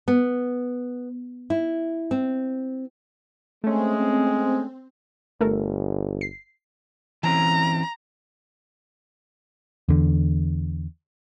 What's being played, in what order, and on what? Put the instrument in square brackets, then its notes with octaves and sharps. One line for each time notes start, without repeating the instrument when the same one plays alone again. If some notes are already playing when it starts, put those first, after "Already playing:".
[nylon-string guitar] B3
E4
C4
[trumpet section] G#3 [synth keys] A3 C#4 [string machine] C4
[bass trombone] G1 [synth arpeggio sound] A3 A4 A#4
[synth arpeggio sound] C7
[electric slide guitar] E3 C4 C#4 [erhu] A#5
[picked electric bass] E2 D3